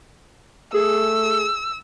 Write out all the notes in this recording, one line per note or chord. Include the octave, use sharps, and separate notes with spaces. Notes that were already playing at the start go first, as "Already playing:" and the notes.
A3 G#4 E6